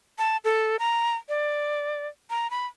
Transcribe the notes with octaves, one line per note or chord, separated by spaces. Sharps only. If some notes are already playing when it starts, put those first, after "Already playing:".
A5
A4
A#5
D5
A#5
B5